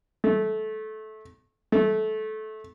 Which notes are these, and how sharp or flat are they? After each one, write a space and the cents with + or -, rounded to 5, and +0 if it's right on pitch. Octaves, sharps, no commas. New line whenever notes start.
A3 -20
A3 -20